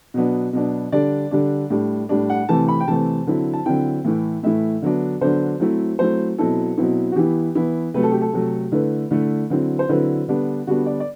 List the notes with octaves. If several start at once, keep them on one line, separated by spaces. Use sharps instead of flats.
B2 F#3 B3 D4
B2 F#3 B3 D4
D3 G3 D4 D5
D3 G3 D4
A2 G3 D4
A2 G3 D4
F#5
C3 E3 A3 C4 A5
B5
G5
C3 E3 A3 C4 A5
D3 F#3 C4 E4
A5
D3 F#3 C4 E4 G5
A2 E3 A3 E4
A2 E3 A3 E4 E5
D3 F#3 B3 D4
D3 F#3 B3 D4 C5
F#3 A3 C4 E4
F#3 A3 C4 E4 C5
B2 F#3 C4 E4 A4
B2 F#3 C4 E4
F#4
E3 B3 E4 G4
E3 B3 E4
C3 F#3 A3 B4
A4
G4
A4
C3 F#3 A3
D3 A3 E4 B4
D3 A3 E4
D3 F#3 C4 E4
C5
D3 F#3 C4 E4 B4
D3 G3 B3 D4
D3 G3 B3 D4 F#4
D5
D5